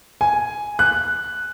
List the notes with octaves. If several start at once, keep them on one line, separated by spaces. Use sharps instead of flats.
G#5
F#6